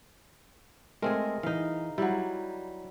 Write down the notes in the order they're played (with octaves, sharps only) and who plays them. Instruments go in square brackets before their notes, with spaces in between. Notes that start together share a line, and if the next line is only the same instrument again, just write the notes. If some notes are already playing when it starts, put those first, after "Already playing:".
[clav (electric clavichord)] G#3 A3 C4 [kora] G#4 A#4
[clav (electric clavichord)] E3 [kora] D#4 F5
[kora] F#3 G3 [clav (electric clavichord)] E4